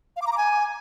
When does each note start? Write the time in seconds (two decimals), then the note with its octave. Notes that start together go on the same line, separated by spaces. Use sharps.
0.16 F5
0.22 D6
0.27 A#5
0.32 D6
0.37 G#5